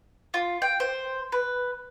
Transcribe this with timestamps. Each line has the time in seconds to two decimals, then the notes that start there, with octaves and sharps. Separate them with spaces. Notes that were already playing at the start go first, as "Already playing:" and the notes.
0.34 F4
0.62 G5
0.80 C5
1.32 B4